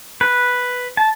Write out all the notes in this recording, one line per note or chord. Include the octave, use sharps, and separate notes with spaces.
B4
A5